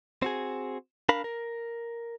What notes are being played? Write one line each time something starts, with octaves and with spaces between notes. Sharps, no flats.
C4 F#4 G#4
D4 A#4 F5 B5
A#4